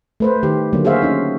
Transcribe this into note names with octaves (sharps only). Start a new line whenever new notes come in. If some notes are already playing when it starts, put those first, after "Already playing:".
A3 B4 C5
D#3 G4
D3 F#3 A#3
F#4 G#4 C5 E5 F5
C#4 D#4